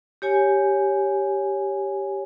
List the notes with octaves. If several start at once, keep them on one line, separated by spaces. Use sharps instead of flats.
G4 C#5 G#5